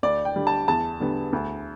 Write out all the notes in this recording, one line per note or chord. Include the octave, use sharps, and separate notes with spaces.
D2 D5
G5
D3 G3
A5
E2 A5
D3 G3 B3
D2